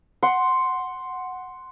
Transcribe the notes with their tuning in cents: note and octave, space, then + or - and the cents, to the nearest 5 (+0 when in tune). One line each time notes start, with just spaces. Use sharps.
F#5 +0 C6 +0